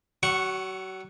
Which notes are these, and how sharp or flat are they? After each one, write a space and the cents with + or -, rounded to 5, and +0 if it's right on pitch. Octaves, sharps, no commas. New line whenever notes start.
F#3 +35 F#5 +0 C#6 -5